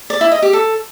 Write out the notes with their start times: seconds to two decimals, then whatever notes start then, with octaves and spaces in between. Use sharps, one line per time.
0.10 D5
0.21 E4
0.32 D#5
0.42 G4
0.53 A4